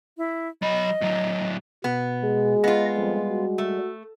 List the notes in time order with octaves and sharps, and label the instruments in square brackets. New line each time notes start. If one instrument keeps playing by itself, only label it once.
[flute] E4
[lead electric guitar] F#3 B5 [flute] D#5
[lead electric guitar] A2 F#3
[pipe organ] B2 [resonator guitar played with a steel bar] B3
[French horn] G#3 [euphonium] G#4
[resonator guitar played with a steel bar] B3 F4 [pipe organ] D#5
[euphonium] F2 [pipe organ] G3
[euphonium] F#4
[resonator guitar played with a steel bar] A3